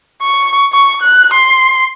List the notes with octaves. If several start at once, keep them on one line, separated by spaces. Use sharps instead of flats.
C#6
C#6
F#6
C6